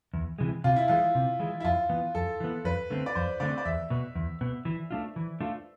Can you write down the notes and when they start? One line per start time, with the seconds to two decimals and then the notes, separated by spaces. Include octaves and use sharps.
0.14 E2
0.39 C3 E3 G#3
0.64 C3 F4
0.76 E4
0.88 E3 G#3 F4
1.15 C3
1.40 E3 G#3
1.60 E4
1.64 F2 F4
1.89 E3 B3
2.15 F2 A4
2.40 E3 B3
2.65 F2 B4
2.90 D3 A3 C4
3.06 D5
3.15 F2 C5
3.40 D3 A3 C4 D5
3.58 D5
3.65 E2 E5
3.90 B2 B3
4.15 E2
4.41 B2 B3
4.65 E3
4.91 A3 D4 F4
5.16 E3
5.41 A3 D4 F4